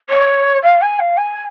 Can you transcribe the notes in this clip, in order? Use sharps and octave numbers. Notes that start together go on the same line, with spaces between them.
C#5
F5
G#5
F5
G#5